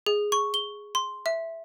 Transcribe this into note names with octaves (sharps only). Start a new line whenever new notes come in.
G#4
C#6
G7
C6
E5